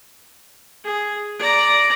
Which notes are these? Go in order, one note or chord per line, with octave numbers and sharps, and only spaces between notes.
G#4
D5 A#5